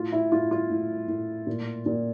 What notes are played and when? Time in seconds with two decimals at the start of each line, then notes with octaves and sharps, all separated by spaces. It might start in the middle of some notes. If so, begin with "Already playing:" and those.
Already playing: A2 F4
0.12 E4
0.32 A2 F4
0.51 F4
0.70 A2
1.08 A2
1.47 A#2
1.86 A#2